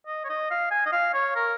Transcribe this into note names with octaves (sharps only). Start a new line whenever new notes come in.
D#5
C#5
D#5
F5
G#5
D#5
F5
C#5
A#4